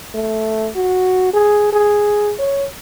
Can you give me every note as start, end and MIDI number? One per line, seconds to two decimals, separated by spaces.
0.15 0.69 57
0.76 1.33 66
1.34 1.69 68
1.73 2.33 68
2.39 2.65 73